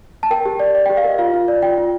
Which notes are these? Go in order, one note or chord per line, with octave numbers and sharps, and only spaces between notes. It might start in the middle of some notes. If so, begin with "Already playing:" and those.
A5
A#4 G5
G4
D5
D5
G5
G4
F5
A#4 D#5
F4 F5
F4
D5
F4 G5
F4